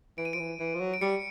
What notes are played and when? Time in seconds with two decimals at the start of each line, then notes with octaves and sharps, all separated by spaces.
0.18 E3 D7
0.25 D#7
0.33 F3 D7
0.39 E3
0.60 E3
0.75 F3
0.80 F#3
0.94 D7
1.01 G3 C#7